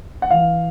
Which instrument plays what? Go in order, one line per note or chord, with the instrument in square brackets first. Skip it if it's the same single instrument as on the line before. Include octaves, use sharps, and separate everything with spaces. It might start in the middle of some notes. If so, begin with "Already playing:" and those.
[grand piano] F#5
E3 F5